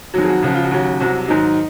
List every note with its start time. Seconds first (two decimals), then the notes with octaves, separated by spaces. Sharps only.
0.14 F2 D#3 F#3 F#4
0.24 G#4
0.29 F#4
0.42 C#2 C#3 F3 F#4
0.54 F4
0.64 F#4
0.71 D#2 C#3 F#3
1.00 C2 C3 F#3 F#4
1.28 G#2 D#3 F#3 D#4